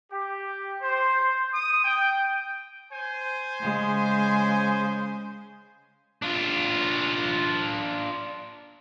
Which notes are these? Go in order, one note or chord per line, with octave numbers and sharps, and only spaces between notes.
G4
C5
C5
D#6
G5
C5 G#5
C#3 G#3
D4 F4